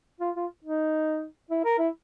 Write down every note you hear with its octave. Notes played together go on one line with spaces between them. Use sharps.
F4
F4
D#4
E4
A#4
E4